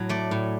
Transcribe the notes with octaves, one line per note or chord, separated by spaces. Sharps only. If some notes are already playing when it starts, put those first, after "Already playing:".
Already playing: A2 F#3
A3 D5
A2